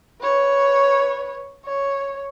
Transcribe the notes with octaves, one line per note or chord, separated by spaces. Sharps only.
B4 C#5
C#5